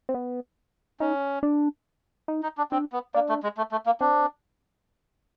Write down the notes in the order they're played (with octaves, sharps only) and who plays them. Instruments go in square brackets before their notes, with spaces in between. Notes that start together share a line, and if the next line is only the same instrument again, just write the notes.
[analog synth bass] C4
B3
[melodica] C#4 [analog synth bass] D#4
[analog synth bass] D4
D#4
[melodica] D#4
D4
[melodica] C4 [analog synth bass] D4
[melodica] B3
[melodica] A#3 [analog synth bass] D4
[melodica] A3
G#3
A3
A3
A#3
[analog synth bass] C4 [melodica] D4